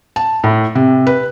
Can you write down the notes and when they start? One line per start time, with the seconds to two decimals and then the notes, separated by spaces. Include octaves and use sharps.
0.16 A5
0.44 A2
0.75 C3
1.07 B4